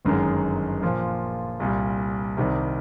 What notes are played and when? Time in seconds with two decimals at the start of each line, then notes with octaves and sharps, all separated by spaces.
0.05 G1 F#2 D#3 G#3
0.82 A#2 F3 A#3
1.60 C2 A#2 G3
2.37 C2 C3 D#3 G3